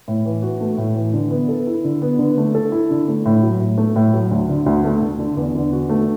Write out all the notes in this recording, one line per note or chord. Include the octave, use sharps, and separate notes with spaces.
A2
E3
F#4
A3
A2
E3
D3
B3
A4
E4
D3
B3
D3
A3
A4
E4
D3
A3
A2
F#3
A2
A3
A2
F#3
D2
D3
D2
A3
D2
D3
E2
D3
F#4
A3